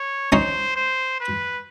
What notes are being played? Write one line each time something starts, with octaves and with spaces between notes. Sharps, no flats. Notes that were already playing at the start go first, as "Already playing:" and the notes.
Already playing: C#5
C#4 D#4 C5
C5
B4